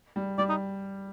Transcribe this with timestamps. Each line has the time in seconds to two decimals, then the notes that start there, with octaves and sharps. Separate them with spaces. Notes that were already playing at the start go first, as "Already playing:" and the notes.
0.16 G3
0.38 G3 D5
0.49 D#4